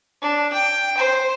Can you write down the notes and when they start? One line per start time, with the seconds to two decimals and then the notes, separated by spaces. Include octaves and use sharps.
0.22 D4
0.53 G5
0.97 C5